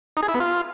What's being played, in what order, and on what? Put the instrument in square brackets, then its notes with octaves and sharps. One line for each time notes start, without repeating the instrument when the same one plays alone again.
[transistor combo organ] D#4
G#4
E4
B3
F4